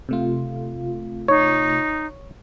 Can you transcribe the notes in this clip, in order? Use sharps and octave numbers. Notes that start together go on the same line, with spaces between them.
C3 A3 F4
D#4 C#5